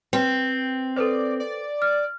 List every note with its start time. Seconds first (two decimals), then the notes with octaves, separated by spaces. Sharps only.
0.13 C4 B4 G5
0.96 A4 B4 C5 D5
1.40 D5
1.82 F6